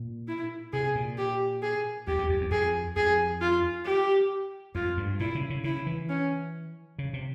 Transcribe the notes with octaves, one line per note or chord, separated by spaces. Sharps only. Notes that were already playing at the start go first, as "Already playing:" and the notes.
Already playing: A#2
E4
C3 G#4
A#2
G4
G#4
E2 G4
E2
F2
E2
F2 G#4
F2 G#4
F4
G4
F2 F4
G2
A#2 E4
C#3
C#3
C#3 E4
E3
C#4
C#3
C3